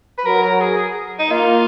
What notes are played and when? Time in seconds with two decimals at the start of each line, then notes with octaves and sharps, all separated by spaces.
0.18 B4
0.26 F#3 A#4
0.43 A#4
0.61 G#4
1.19 D#4
1.31 A#3 F4